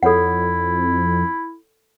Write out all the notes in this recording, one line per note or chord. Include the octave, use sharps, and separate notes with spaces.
F2 E4 A4 C#5 F#5